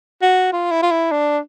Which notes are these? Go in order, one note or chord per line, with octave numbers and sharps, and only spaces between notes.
F#4
F4
E4
F4
E4
D4